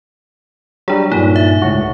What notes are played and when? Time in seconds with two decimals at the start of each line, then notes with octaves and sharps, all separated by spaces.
0.88 F#3 G3 D4 G#4
1.12 G2 A#2 D#4
1.36 E5
1.62 C#2 A2 F#4